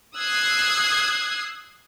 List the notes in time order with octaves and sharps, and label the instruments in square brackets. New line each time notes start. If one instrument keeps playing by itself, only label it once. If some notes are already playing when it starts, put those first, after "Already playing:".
[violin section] D#6 E6 F#6 G#6 C7